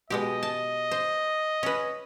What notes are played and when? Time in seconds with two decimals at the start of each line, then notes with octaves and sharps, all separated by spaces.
0.10 B2 G#3 G4 D#5
0.43 A5
0.91 C5
1.63 C#4 B4